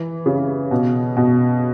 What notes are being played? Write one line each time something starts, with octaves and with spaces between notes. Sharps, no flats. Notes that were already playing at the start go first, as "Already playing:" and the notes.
Already playing: E3
C#3
B2
B2